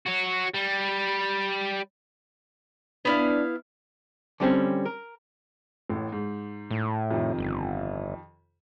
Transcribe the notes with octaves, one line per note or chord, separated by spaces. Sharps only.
F#4 C#5
G3
B3 D4 E4 F5
D3 G3 C4 C#4
A#4
A1 A2
G#2
A2
F2 C3 D#3
G1